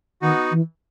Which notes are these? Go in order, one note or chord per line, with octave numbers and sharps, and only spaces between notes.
D#3 B3 D#4 F#4
E3